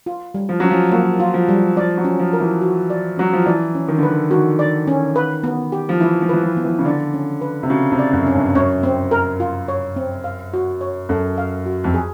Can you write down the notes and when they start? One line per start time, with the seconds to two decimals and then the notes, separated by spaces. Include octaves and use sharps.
0.06 F4
0.34 G3
0.49 F3
0.60 F#3 C#4
0.70 F3
0.92 F#3 A#3
1.20 F4
1.34 F3
1.49 G3
1.76 F3 D5
1.97 F#3
2.04 C#4
2.19 F3
2.33 A#4
2.40 E3
2.61 F#4
2.90 D5
3.17 F#3 C#4
3.33 F3
3.46 E3 D5
3.75 C#4
3.88 D#3
3.98 D3
4.03 D#3 B4
4.31 D#3 F#4
4.59 D5
4.87 C#4
5.16 B4
5.44 B3
5.72 G4
5.89 F3
6.00 E3 E4
6.22 F3
6.29 E3 B4
6.42 F3
6.57 B3
6.64 E3
6.78 C#3
6.85 D3 D5
7.14 C#4
7.41 B4
7.63 C3
7.70 C#3 F#4
7.92 C3
7.99 D5
8.13 F#2
8.27 C#4
8.34 G2
8.55 F#2 C#5
8.83 C4
9.11 A#4
9.40 F4
9.68 C#5
9.96 C4
10.24 F5
10.54 F#4
10.81 C#5
11.09 F#2 A4
11.38 F5
11.66 F#4
11.84 F2
11.94 G#4